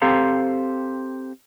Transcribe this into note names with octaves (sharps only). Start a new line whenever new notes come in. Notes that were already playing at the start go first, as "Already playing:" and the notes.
C4 G4 A4 C5 F5 A#5